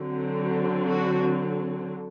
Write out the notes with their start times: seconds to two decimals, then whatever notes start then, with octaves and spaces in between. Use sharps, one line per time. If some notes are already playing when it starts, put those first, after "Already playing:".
Already playing: D3 F#3 C4
0.88 F#4